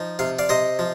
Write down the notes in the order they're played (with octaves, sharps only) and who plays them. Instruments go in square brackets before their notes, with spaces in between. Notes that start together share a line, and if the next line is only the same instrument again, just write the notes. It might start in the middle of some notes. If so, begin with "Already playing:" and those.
Already playing: [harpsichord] F3 D#4
C3 F5
D5 F5
C3 C5 D#5
F3